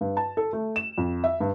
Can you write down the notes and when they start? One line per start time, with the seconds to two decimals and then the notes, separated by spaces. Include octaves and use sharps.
0.01 G2
0.17 A5
0.37 A4
0.53 A3
0.76 E7
0.98 F2
1.24 E5
1.40 G2